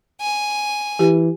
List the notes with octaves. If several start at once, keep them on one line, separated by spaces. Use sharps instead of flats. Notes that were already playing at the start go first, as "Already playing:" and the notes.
G#5
E3 G4